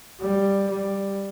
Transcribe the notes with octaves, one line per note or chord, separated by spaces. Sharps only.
G3
G3